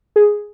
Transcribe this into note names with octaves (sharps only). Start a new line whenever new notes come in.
G#4